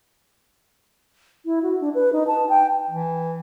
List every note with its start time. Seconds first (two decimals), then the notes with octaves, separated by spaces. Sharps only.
1.45 E4
1.63 F#4
1.81 D4
1.95 B4
2.13 D#4
2.27 A5
2.49 G5
2.90 E3